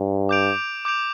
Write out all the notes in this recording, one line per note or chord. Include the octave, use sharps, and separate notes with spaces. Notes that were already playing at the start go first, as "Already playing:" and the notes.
Already playing: G2
D6 G6 D7 F7
D6 G6 D7 F7